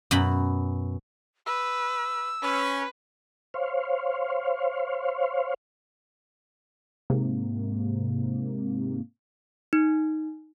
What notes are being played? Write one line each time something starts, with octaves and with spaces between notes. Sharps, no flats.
F#2 B2 B5
B4 E6
C#4 B4
C5 C#5 F5
G#2 C3 A#3
D#4